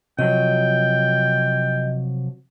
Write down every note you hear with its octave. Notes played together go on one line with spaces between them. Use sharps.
C3 F3 F#3 D#5 G5